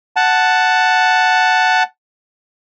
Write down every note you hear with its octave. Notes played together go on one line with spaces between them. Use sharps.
F#5 A5